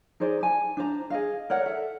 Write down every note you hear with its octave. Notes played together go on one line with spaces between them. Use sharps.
D#4 G#4 C5 D5
G4 G#5 A5
D4 C5 A#5
G#4 D#5 F5
A#4 C#5 D5 F#5
A4 E5 F#5